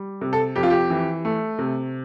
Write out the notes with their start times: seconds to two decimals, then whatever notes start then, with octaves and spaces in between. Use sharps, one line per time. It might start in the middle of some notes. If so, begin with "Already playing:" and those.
Already playing: G3
0.21 C3
0.33 A4
0.56 F2 G4
0.63 F4
0.70 G4
0.90 E3
1.25 A3
1.59 C3